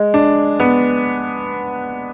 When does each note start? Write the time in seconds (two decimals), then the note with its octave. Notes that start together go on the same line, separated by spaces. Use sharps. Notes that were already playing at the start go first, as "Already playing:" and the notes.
Already playing: G#3
0.14 D4
0.60 B3